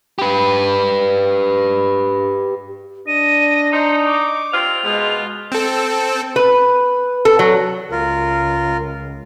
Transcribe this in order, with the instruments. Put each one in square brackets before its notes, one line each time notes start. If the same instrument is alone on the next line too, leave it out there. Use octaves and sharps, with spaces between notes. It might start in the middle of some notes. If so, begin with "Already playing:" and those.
[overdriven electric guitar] G4 B4
[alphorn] D4 [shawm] D#5 [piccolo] D#7
[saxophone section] D#4 [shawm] C5 [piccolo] C#7
[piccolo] C#6 [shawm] D6
[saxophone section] C3 C4 F4 [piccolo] F7
[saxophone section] B2 [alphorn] G#3 [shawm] F4
[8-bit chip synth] C4 A4
[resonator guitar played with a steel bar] B4
A4
F#3
[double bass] C#2 [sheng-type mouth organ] F4 A#4